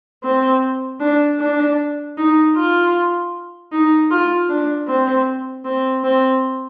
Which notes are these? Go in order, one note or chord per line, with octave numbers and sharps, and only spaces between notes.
C4
D4
D4
D#4
F4
D#4
F4
D4
C4
C4
C4